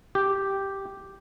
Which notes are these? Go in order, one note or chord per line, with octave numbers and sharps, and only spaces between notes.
G4